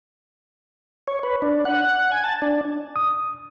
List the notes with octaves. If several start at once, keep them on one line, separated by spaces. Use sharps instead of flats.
C#5
B4
D4
F#5
G#5
A5
D4
D#6